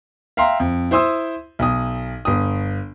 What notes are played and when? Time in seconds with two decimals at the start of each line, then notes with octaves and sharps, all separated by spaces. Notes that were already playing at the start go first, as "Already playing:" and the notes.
0.37 E5 F5 G5 A#5 C6
0.60 F2
0.91 E4 C5 C6 D#6 E6
1.59 B1 D#6
2.25 G1 D#6